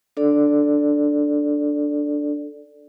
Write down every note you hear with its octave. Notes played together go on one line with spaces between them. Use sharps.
D4 A4 D5